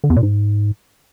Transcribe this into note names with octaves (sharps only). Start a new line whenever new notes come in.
D3
E2
A#2
G#2